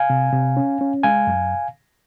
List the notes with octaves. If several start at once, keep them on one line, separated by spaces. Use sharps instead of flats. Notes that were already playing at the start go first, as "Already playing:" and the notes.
Already playing: F5 G#5
C3
C3
C#4
C#4
G#3 F5 G#5
F#2